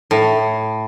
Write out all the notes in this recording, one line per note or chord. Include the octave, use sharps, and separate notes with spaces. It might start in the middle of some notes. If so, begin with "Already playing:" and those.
A2